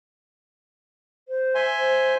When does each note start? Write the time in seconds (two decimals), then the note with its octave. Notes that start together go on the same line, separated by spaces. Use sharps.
1.28 C5
1.55 E5 G#5 C6
1.79 C5